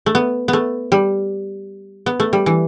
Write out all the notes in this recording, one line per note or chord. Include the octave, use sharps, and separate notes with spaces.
A3
B3
B3
A3
G3
B3
A3
G3
E3